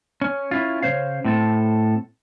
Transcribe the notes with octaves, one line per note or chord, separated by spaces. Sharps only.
C#4
C#4 E4 F4
C#3 B3 C5 C#5 F5
A2 C4 A4